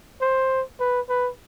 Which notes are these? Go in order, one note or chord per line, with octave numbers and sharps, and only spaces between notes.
C5
B4
B4